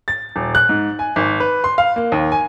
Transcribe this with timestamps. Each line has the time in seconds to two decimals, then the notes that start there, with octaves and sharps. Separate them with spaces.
0.08 A6
0.36 D#1
0.55 F#6
0.69 G#2
0.99 G#5
1.16 G#1
1.40 B4
1.64 C6
1.78 F5
1.96 A#3
2.12 D#2
2.32 G#5